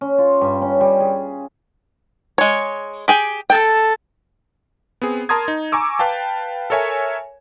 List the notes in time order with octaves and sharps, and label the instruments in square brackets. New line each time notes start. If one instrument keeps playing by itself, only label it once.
[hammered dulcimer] C#4
F4
G2
C#4
G3
G#4
[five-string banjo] G#3 C#5
G4 G#4 G5
[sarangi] A4 [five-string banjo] G5
[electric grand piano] B3 C4 G#4
A#4 A5 A#5 C6 D#6 G#6
D#4
G#5 A#5 C#6 D6 E6
B4 F5 G5 A5
A4 A#4 C#5 E5 G#5